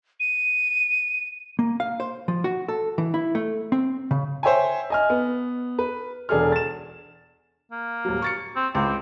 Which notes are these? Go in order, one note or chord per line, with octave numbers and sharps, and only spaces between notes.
D#7
A#3
F5
C5
F3
F#4
A4
E3
E4
A3
C4
C#3
C5 C#5 E5 G5 G#5
D#5 G#5 F6
B3
B4
E1 D4 G#4 A4 F6
A6 E7
A#3
D#1 F#3
C#6 A6 C#7
C4
C#2 C4 D6